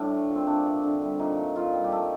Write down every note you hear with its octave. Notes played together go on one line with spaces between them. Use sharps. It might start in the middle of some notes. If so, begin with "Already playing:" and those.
Already playing: A2 G3 D4
A3
A#2
C4
A3 D4
C3
D3
G3
A#2 D#4
A3
A#2 F4
G3
G4
A3 A4